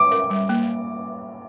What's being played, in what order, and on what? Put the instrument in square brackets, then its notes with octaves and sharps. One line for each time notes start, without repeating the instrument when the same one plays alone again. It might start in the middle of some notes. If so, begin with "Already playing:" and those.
Already playing: [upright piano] D6
[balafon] A#4
G3
A#3